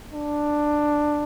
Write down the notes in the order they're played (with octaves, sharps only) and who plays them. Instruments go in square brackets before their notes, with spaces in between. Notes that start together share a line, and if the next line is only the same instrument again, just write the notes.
[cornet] D4